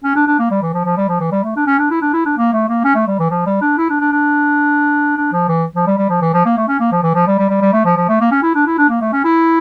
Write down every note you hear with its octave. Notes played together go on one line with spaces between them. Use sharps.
C#4
D4
D4
A#3
G3
E3
F3
F3
G3
F3
E3
G3
A3
D4
C#4
D4
E4
D4
E4
D4
A#3
A3
A#3
C#4
A3
G3
E3
F3
G3
D4
E4
D4
D4
D4
D4
F3
E3
F3
G3
G3
F3
E3
F3
A#3
A3
C#4
A#3
F3
E3
F3
G3
G3
G3
G3
A3
F3
F3
A3
A#3
C#4
E4
D4
E4
D4
A#3
A3
C#4
E4